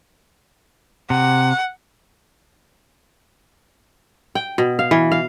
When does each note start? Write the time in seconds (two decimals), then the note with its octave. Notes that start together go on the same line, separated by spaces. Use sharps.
1.10 C3 F#5
4.35 G5
4.58 B2
4.79 F5
4.91 E3
5.12 F5